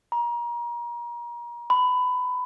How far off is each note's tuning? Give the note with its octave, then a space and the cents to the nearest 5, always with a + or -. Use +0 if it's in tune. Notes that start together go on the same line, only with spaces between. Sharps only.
A#5 +30
B5 +20